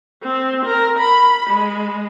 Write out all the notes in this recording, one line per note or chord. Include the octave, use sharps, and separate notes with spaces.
C4
A#4
B5
G#3